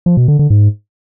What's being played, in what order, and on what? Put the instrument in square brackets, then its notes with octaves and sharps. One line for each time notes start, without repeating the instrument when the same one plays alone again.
[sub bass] F3
B2
D3
D3
G#2